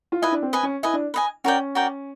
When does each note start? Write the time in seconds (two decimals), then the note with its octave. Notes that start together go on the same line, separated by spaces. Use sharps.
0.12 F4
0.22 E4 B4 D#5 G#5
0.32 D4
0.42 C4
0.53 B4 D#5 G#5
0.63 C#4
0.83 E4 B4 D#5 G#5
0.93 D4
1.14 B4 D#5 G#5
1.44 C#4 F#4 A#4 D5 G5
1.75 F#4 A#4 D5 G5